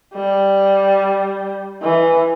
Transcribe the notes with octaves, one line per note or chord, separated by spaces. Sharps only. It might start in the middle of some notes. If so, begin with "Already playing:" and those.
G3
E3